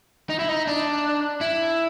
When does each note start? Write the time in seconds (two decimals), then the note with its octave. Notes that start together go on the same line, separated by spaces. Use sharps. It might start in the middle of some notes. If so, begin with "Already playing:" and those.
0.30 D#4
0.39 E4
0.49 D#4
0.67 D4
1.41 E4